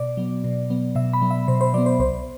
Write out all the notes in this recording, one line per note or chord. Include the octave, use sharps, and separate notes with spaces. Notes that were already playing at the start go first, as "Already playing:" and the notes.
Already playing: B2 D5
F#3 B3
B2
F#3 B3
B2 E5
B5
F#3 B3
E5
B2 C5
C5
F#3 B3 D5
C5
C2 C5